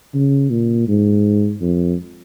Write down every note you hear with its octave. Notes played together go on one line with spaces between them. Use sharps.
C#3
A#2
G#2
F2